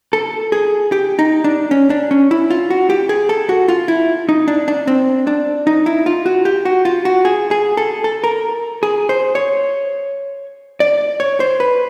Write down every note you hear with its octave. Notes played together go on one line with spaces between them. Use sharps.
A4
G#4
G4
D#4
D4
C#4
D4
C#4
E4
F4
F#4
G4
G#4
A4
F#4
F4
E4
D#4
D4
D4
C4
D4
D#4
E4
F4
F#4
G4
F#4
F4
F#4
G#4
G#4
A4
A4
A#4
G#4
C5
C#5
D5
C#5
C5
B4